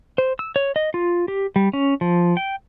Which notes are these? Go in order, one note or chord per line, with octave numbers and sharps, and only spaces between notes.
C5
E6
C#5
D#5
F4
G4
G3
C#4
F3
G5